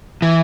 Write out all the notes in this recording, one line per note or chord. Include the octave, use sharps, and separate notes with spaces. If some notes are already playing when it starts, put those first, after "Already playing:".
E3